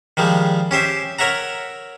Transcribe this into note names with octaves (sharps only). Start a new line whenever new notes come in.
D#3 F3 G3 G#3
C#4 G4 C5 E5
A#4 C#5 E5 F#5 A#5